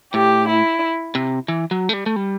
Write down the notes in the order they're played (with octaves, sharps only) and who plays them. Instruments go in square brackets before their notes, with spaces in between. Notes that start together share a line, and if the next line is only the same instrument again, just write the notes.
[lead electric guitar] A2 [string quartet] G4
[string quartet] E4
[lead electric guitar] C3
E3
F#3
A3
G3
A3
G3